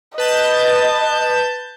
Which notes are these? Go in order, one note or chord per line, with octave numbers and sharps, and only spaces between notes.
B4 D#5 A5 G6